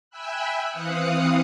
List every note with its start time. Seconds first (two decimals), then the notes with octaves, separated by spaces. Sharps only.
0.10 E5 G5 G#5 B5 E6 F#6
0.69 E3 C4 F5 D#6 F#6 C#7